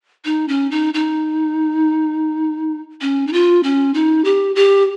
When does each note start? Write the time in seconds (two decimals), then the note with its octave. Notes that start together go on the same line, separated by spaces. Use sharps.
0.25 D#4
0.48 C#4
0.71 D#4
0.94 D#4
3.01 C#4
3.27 D#4
3.33 F4
3.63 C#4
3.94 D#4
4.25 G4
4.56 G4